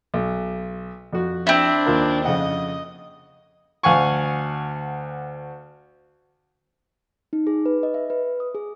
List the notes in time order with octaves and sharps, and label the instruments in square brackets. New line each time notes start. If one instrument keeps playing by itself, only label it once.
[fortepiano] B1
F2 F#4
[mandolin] C4 E4 [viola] D4
[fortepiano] D#2 F4 A#4
[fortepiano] F2 C#3 F#5 [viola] D#5
[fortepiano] D2 F5 F#5 G#5 C#6
[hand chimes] D#4
G#4
B4
D#5
E5
B4
D#6
G#4